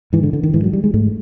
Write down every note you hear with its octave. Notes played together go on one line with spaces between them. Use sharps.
G#2 E3
D3
D3
D#3
G#2 E3
F#3
G3
G#3
G#2 A3